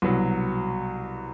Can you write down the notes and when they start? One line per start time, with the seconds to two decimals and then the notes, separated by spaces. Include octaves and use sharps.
0.02 C2 B2 F#3